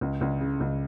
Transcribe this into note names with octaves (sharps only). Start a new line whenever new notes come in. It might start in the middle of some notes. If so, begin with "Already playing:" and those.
C#2
C#2
C#3
C#2